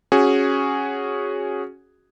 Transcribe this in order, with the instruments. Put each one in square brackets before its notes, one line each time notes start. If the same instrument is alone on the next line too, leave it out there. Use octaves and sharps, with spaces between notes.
[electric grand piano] C#4 F#4 G#4